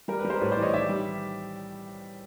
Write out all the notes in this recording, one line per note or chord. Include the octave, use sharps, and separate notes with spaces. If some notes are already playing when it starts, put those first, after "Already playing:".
G3 A#4
B4
G3
A#4 C5
A2 B4 C#5
C5 D5
E3
C#5 D#5
D#3 D5 E5
G3